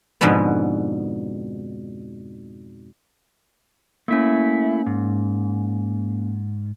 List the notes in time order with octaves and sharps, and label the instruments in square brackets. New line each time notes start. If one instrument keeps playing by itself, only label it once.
[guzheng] F2 G#2 B2 D3 G#3 B3
[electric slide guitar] A3 E4 [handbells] A#3 C#4
[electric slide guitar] G#2